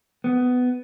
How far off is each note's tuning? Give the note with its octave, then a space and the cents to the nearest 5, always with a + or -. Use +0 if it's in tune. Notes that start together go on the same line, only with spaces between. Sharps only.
B3 +15